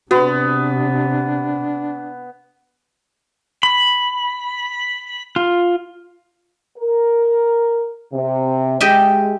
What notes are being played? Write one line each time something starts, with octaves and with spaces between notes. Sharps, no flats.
C3 B3 D4 F#4
B5
F4
A#4
C3
G#3 G4 D#5 E5